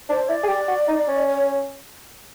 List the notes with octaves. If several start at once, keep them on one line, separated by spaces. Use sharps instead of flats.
D4 C5
E4 D5
G#4
G4
F#4
D#4
C#4
C#5